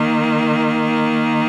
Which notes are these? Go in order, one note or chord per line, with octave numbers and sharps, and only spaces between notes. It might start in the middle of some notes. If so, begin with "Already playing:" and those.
Already playing: D#3 A#3